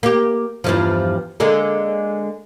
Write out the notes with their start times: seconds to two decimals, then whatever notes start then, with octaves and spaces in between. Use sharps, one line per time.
0.03 A#3 G4
0.64 E2 G2 F3
1.40 D3 G#3 A#3